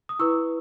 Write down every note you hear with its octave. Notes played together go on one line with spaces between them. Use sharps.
D#6
E4 B4 C#6 E6